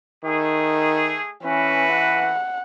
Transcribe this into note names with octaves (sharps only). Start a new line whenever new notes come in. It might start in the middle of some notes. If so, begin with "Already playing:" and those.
D#3 A3 G#4
E3 A3 C#4 F#4 B4
F#5